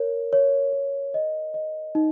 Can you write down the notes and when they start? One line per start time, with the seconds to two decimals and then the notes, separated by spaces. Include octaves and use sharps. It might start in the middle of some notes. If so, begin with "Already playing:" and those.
Already playing: A#4 C#5
0.33 C#5
0.73 A#4
1.14 D#5
1.54 D#5
1.95 D#4